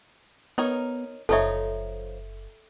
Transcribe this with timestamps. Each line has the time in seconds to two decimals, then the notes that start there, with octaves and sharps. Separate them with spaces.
0.58 B3 D#4 A#4 C#5
1.29 F#1 F3 D#4 A4 C#5 E5